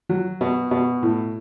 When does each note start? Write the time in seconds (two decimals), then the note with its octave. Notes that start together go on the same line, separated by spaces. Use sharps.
0.09 F#3
0.41 B2
0.71 B2
1.03 A2